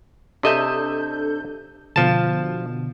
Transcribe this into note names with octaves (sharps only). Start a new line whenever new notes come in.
C3 D4 A4 D#5 E5 G6
B2 D3 F3 A5